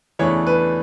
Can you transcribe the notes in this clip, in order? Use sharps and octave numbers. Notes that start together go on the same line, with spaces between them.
E2 C#3 E3 A3 D4 C#5
B4